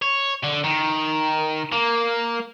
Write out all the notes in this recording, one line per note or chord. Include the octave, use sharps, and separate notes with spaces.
C#5
D3
D#3
A#3